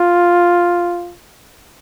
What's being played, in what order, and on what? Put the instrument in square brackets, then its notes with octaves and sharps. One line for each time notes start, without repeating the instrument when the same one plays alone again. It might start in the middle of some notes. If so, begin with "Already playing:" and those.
Already playing: [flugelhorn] F4